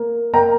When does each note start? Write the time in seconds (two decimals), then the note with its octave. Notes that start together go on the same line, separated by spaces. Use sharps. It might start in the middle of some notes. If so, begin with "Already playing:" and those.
Already playing: A#3
0.33 A#3 G5 A#5